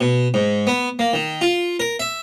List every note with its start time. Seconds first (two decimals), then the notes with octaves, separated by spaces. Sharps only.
0.01 B2
0.34 G#2
0.67 B3
0.99 A#3
1.13 D#3
1.41 F4
1.80 A#4
1.99 E5